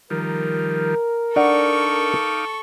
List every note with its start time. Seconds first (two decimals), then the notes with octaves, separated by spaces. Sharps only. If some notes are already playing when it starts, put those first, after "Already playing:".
0.10 D#3 F3 G3 A#4
1.36 D4 D#4 A4 F5 F#5 C#6 D6